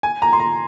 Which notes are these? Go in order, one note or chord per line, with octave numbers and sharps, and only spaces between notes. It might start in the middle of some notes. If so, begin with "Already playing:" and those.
G#5
A#5
C6
A#5